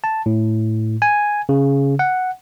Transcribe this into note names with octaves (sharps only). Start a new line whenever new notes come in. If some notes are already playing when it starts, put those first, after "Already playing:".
A5
A2
G#5
C#3
F#5